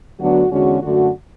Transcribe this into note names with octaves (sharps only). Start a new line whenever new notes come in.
D2 D3 F#3 B3 D4 F#4
E2 D3 G#3 C#4 F#4
F#2 D3 A3 F#4